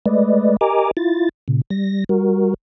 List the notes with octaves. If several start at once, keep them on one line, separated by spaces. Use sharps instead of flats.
G#3 A3 B4 D5 D#5
G4 A#4 D#5 G#5 A#5 D6
E4 F4 A6
A#2 C#3
G3 A#6
G3 F#4 A#4